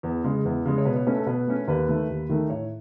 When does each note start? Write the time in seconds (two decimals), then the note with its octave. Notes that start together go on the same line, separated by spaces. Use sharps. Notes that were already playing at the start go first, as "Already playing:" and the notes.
0.03 E2
0.24 C#3 G#3
0.45 E2
0.65 C#3 G#3
0.78 C#5
0.85 B2 B4
0.96 C#5
1.07 A3 C#4 B4
1.16 A4
1.26 B2 B4
1.47 A3 C#4
1.67 D#2 B4
1.88 D#3 A3
2.10 D#2
2.29 D#3 A3
2.50 A2 C#5